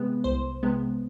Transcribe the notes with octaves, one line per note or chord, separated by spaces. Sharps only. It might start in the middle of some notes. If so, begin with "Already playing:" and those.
Already playing: C3 G#3 B3
C2 C5
C3 G#3 B3